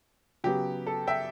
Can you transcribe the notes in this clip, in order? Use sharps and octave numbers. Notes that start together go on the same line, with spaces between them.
C#3 F#3 B3 G4
A4
E5 G5